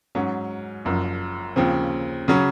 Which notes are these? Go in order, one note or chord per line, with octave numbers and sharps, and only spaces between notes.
G#2 F#3 C#4
F#1 F#2 F3
D#2 C#3 F3 C4
C#3 F#3 C#4